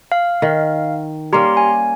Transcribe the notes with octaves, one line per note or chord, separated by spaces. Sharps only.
F5
D#3
G3 A#3 C#4 G4 A#5 C6
G#5